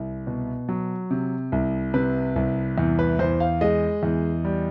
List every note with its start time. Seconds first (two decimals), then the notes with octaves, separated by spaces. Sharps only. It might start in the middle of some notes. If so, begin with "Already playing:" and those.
Already playing: C2
0.27 B2
0.69 F#3
1.11 C3
1.52 C2
1.94 C3 B4
2.36 C2
2.78 E2
2.99 B4
3.19 E2 C5
3.40 F5
3.61 G#3 D#5
4.03 E2
4.45 G3